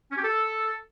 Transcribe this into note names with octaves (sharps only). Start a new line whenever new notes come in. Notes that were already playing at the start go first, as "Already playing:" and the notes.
C#4
G4
A4